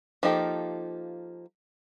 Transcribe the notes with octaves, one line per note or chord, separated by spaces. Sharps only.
F3 A#3 D#4 G4 A4